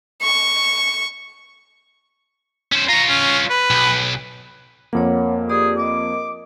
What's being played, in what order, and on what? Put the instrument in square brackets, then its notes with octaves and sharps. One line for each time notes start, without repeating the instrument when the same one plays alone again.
[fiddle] C#6
[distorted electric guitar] C#4 C5
[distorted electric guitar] F4 C#5 [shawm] A#5
[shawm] C#4
B4
[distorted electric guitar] B1
[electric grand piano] F2 A#3 [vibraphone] C#5 F#5
[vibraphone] G4 D5 [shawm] G#4
[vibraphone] A#4 D#5 [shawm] D6